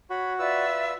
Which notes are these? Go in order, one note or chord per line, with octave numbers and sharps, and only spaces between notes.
F#4 C#5 B5
F4 B4 D5 E5 E6